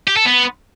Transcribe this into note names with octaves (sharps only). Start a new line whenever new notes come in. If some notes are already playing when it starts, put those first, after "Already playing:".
G4
A4
B3